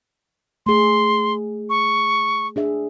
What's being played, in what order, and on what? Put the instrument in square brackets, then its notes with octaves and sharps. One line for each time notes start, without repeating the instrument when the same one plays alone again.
[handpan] A3 G#4 [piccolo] C6
[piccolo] C#6
[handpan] D4 G#4 E5